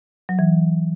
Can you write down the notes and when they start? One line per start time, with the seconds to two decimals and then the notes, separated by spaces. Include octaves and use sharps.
0.29 F#3
0.39 E3